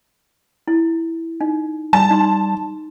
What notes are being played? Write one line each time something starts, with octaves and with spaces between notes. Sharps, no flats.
E4
D#4
G3 A5
D#4 C6